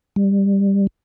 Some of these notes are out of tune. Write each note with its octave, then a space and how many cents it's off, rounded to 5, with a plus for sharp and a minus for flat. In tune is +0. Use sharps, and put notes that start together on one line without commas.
G3 +15